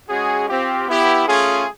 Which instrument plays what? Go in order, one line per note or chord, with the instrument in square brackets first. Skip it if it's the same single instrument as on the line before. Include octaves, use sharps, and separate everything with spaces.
[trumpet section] G#3 C#4 F#4 G#4
C4 F4 G4
B3 E4 G4
A3 C#4 F4 G#4